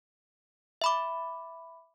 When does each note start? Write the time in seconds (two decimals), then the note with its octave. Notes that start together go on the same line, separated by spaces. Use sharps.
0.82 E5 B5 D6